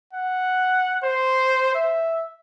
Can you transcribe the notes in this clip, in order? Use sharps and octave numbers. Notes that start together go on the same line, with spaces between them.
F#5
C5
E5